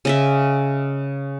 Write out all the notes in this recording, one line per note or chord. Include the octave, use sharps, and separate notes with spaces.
C#3 D#5 E5